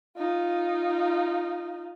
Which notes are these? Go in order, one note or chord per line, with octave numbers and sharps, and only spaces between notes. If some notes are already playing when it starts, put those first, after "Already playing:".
D#4 F4